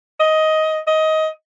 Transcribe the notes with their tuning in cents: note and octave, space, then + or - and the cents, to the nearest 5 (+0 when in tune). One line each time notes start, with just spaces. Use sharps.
D#5 +15
D#5 +15